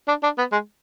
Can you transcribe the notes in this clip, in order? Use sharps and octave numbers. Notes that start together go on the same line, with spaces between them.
D4
D4
B3
G#3